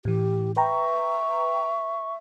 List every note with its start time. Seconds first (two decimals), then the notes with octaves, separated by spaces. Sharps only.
0.05 A2 E3 G4
0.57 B4 E5 G5 A#5 C#6